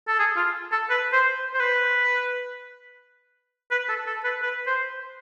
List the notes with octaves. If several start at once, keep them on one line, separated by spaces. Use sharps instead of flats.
A4
G#4
F4
A4
B4
C5
C5
B4
B4
A4
A4
B4
B4
C5